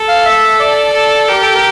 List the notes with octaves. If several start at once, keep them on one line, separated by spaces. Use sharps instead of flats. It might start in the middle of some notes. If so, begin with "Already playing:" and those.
Already playing: A4
F5
E5
D5
A4
G4 A#4
A4
A#4